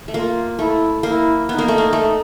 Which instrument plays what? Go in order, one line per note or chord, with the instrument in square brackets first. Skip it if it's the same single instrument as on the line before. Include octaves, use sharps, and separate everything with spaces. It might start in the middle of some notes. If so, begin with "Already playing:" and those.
[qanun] A3
[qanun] A#3 [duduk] F4
[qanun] A3 [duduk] E4
[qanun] A#3 [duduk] E4
[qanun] B3 [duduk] D#4
[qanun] A#3
A3
A#3
A3